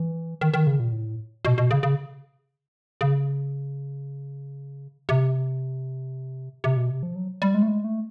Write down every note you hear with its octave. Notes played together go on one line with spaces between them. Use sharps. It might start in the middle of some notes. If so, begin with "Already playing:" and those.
Already playing: E3
D#3
D#3
C#3
A#2
A2
B2
B2
C#3
C#3
C#3
C3
C3
B2
C3
F3
F#3
G3
G#3
A3
G#3
A3